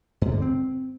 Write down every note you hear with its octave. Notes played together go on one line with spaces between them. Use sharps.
G2
D3
C4